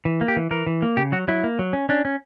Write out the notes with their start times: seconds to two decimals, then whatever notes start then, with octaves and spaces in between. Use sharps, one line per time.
0.05 E3
0.21 A#3
0.28 G4
0.37 E3
0.51 E3 A#4
0.66 E3
0.82 A#3
0.97 C#3 G4
1.12 F#3 F#4
1.28 F#3 E4
1.44 A#3
1.59 F#3
1.73 C#4
1.89 C#4 D4
2.05 C#4